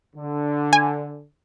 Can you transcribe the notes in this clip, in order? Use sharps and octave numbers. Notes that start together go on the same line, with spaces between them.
D3
G#5